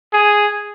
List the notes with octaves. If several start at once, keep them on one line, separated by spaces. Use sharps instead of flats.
G#4